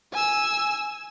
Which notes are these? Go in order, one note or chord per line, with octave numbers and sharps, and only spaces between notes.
G#5 E6